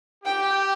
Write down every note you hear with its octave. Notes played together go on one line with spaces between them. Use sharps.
G4 G5